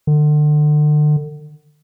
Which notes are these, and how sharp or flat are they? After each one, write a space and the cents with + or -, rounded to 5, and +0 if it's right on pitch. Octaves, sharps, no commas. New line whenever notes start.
D3 +35